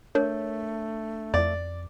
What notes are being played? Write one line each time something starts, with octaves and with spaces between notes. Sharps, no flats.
A3 D4 A#4 C#5
F2 D5